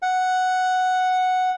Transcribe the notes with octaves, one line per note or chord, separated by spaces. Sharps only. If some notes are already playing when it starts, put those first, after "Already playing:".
F#5